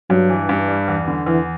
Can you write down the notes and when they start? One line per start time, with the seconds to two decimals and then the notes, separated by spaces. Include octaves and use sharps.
0.10 G2 F#3
0.30 E3
0.49 G2
0.68 G3
0.88 E2
1.08 D3
1.26 E2 E3